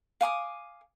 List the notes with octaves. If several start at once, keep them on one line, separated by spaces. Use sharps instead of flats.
F5 G#5 D6 D#6